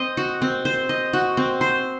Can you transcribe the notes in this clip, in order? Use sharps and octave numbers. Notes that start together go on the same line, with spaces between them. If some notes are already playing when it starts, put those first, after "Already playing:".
Already playing: C4 C5 D#5
F#4
C4
C5
D#5
F#4
C4
C5